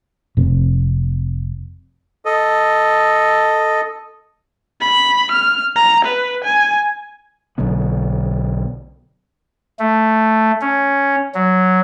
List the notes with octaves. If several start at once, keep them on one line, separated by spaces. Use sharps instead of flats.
F1 C3
A4 D#5
B5
F6
A#5
B4
G#5
B1 D3 F#3 B3
A3
C#4
F#3